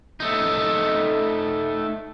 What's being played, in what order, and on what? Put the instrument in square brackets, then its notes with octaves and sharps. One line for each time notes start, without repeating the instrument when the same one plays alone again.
[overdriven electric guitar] A3 D#4